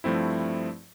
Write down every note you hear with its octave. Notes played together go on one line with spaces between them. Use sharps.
G2 F3 A3 C4 E4